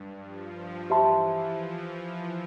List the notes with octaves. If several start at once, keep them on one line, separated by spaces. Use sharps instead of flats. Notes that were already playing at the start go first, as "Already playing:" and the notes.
Already playing: G2
F3
G2
E3 G4 C5 E5 A5 C6
F3